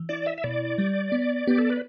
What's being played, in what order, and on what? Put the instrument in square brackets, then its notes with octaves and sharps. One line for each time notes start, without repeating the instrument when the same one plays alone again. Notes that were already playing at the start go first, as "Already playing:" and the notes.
Already playing: [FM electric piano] E3
[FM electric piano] E4 [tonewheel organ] D5
[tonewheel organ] E5
E5
[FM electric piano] B2 [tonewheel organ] D5
[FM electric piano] G3
B3
[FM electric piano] B3 [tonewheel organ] G4
[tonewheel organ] A4
B4